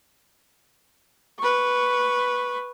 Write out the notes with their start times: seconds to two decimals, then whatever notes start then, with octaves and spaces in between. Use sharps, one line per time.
1.39 B4 C#6